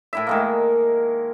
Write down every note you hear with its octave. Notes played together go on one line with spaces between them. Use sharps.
A2 E4 E5
D#3 G#3 A#3